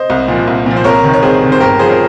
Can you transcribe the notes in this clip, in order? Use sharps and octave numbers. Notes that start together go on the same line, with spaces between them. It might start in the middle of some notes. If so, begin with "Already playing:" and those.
Already playing: C5 D#5
C2
A#2 F3
C2
A#2 F3
C5
C2 A#4 C#5
C3 D#3
C#5
C2 G#4 C5
C3 D#3
C5
G1 G4 A#4
F3 G#4 C5
A#4 C#5